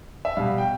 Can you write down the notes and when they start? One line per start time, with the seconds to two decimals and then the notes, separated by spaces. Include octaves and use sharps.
0.25 E5
0.36 B2 G3 F5
0.58 G5